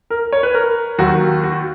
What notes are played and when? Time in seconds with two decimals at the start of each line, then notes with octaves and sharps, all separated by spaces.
0.10 A#4
0.32 C#5
0.43 B4
0.54 A#4
0.98 D#2 D#3 F#3 F#4
1.44 F#4